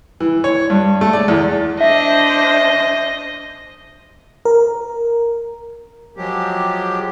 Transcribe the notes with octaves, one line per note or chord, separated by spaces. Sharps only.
E3
C#5
G2
A3
D5
E2
D4 C5 D#5 E5
A#4
F3 F#3 G#3 G4